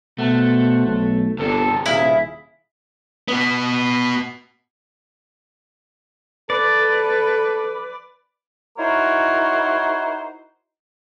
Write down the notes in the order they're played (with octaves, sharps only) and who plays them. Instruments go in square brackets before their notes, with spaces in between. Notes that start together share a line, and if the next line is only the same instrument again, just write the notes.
[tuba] B2 [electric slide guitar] A3 [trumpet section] C5 F#5 A5
[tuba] B1
[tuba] G1 [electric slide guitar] C3 D4 [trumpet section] C4 A4
[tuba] D#1 [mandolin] E4 [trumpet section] G#4 F5
[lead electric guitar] B3 F#4
[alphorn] A4 [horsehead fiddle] B4 [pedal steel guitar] D5
[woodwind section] D#4 E4 F#4 A#4 C5 C#5